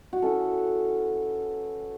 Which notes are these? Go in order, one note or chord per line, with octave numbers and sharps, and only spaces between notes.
F#4
E3 C#4 E4 A4